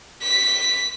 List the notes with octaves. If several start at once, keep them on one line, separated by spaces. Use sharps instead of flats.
B6